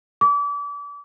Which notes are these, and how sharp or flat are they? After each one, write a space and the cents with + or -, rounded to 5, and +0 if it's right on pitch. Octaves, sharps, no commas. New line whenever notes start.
D6 -35